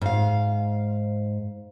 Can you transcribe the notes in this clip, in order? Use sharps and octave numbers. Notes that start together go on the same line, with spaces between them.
G#2 F5